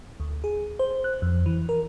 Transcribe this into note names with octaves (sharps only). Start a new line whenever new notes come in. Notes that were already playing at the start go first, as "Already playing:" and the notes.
D2
G#4
C5
F#6
F2
E3
A#4